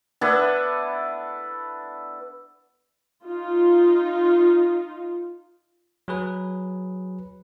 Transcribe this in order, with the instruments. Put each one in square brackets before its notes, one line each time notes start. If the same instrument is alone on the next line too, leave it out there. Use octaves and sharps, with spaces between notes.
[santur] B3 D4 E4 A4
[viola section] D#4 F4
[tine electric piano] F#3 G#4 B4